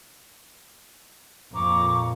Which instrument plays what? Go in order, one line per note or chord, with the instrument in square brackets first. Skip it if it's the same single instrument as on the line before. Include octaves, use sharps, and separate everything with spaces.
[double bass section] F2 A#2 [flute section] A#5 C#6 D6